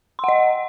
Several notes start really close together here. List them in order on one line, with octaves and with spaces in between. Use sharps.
C6 F#5 D#5